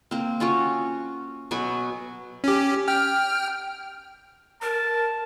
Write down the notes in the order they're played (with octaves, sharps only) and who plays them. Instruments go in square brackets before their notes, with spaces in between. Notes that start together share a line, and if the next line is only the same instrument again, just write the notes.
[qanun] A#3 C4
C#4 F4 F#4 C#5
B2 F#3 G#5 B5
[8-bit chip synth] C#4 G4
G5 F6
[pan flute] A#4 [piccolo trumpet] A5